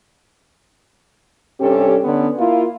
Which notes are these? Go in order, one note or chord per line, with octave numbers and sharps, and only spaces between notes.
G2 C3 C#4 G4 A4
D3 B3 C#4
A#3 E4 F4